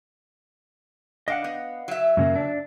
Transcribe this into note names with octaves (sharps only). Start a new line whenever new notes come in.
D4 D#5 F5 F#5
B3
F#3 E5
F#2 C#3 A#3
D4